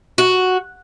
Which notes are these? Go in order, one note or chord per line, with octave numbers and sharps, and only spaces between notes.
F#4